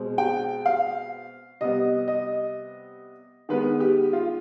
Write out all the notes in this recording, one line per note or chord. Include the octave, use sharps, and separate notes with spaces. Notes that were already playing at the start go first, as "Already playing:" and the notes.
Already playing: B2 G#3 C4
G5
F5
C3 G3 B3 D#5
D#5
D#3 G#3 B3 B4
G4
F4